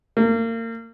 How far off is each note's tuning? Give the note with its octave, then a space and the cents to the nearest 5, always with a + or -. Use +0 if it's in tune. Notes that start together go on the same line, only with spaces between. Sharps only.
A#3 -35